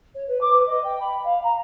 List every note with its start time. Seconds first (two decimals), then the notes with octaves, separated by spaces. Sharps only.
0.15 C#5
0.28 B4
0.41 D6
0.52 B4
0.67 D#5
0.84 G5
1.00 B5
1.24 F5
1.43 A#5